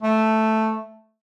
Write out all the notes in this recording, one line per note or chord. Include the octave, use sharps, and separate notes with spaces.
A3